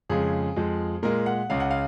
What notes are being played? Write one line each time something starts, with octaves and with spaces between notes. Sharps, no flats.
F2 C#3 G#3 G#4
F2 F3 G#3
A#2 G#3 A#4
F#5
C#2 C#3 G#3 F5
F#5
F5